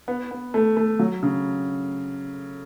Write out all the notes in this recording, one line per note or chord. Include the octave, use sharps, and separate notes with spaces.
B3
B3
A3
A3
F#3
C#3